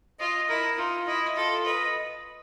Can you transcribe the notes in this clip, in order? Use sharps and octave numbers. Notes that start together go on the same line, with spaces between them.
F4 D#5
E4 A#4
D#4 F4
E4 D#5
F4 A4
B4 D#5